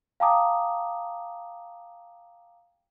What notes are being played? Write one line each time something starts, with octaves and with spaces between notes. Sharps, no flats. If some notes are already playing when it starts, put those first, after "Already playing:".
F5 G5 A5 A#5 D6 D#6